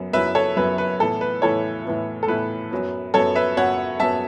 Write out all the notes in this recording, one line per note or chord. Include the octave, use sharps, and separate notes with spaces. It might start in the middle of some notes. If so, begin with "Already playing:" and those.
Already playing: F#2 F#3 B3
F#2 F#3 B3 E4 B4 E5
A4 C#5
F#2 F#3 B3 E4 B4
B4
A2 E3 B3 E4 A4
B4
A2 E3 B3 E4 A4 C#5
A2 E3 B3 E4
A4
A2 E3 B3 E4 B4
F#2 F#3 B3
F#2 F#3 B3 A4 C#5
B4 E5
F#2 F#3 B3 C#5 F#5
F#2 F#3 B3 E5 A5